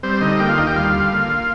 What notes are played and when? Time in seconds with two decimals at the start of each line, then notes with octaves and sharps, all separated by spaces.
0.03 G3 C4 C5
0.21 D3 D#4 D#5
0.39 A#3 G4 G5
0.48 F4 F5
0.58 D#2 D#4 D#5
0.67 G4 G5
0.76 G3 F4 F5
0.94 D3
1.12 A#3